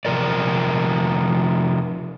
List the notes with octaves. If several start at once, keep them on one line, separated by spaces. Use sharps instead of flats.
C3 F3 A#4 D5